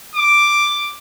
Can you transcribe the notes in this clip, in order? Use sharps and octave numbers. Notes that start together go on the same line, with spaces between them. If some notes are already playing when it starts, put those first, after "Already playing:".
D6